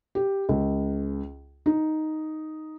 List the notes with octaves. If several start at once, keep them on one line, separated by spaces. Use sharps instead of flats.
G4
C#2
D#4